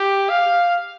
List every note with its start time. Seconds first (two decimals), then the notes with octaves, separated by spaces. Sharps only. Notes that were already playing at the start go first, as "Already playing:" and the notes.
Already playing: G4
0.29 F5